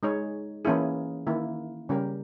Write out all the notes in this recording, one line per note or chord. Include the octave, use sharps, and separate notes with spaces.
G#3 D#4 G#4 C#5
E3 A#3 C#4 E4 G#4
D#3 A#3 E4
C#3 G3 C#4 G4 A#4